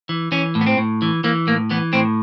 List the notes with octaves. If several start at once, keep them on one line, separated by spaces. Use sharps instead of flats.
E3
E3 C#4
A2
B3
C4
A2
E3
E3 A#3
A2 A#3
E3 B3
A2 C4